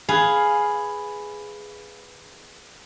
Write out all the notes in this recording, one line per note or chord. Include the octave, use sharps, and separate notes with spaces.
G#4 B4 F5